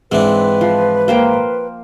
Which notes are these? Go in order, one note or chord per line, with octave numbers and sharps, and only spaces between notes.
G#2 E3 C4 D4 B4
F3
A#3 C5 G5